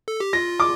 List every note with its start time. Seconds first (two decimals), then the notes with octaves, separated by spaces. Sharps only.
0.08 A4
0.20 G4
0.33 F4 A#6
0.60 D6